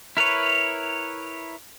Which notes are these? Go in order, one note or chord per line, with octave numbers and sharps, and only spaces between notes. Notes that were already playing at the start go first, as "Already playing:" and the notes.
E4 A#4 B4 C#5